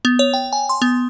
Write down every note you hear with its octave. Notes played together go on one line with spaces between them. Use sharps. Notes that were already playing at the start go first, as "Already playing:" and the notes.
B3
C#5
G5
G#5
C6
B3